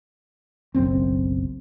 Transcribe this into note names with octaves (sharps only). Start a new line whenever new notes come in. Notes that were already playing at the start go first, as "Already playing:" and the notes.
F#1 B1 F#2 C4